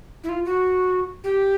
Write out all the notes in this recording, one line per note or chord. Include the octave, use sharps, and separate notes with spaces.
E4
F4
F#4
G4